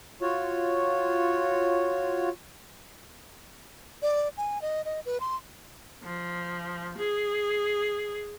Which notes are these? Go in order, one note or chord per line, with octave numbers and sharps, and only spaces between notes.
F4 F#4 C#5
D5
G#5
D#5
D#5
B4
C6
F3
G#4